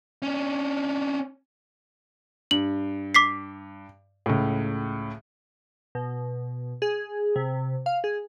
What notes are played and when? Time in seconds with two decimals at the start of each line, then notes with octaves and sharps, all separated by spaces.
0.22 C#4 D4
2.51 G2 F#7
3.15 D6 B6 C7
4.26 C#2 A2
5.95 B2
6.82 G#4
7.36 C3
7.86 F5
8.04 G#4